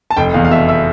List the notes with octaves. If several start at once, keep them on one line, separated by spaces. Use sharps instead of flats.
A5
F1 G5
E2 F5
F5
B2 E5
E5